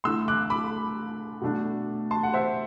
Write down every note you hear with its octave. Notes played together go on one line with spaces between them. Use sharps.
D3 A3 E4 C6 E6
D6 F#6
B5 D6
B2 A3 D4
A5 C6
F#5
C5 E5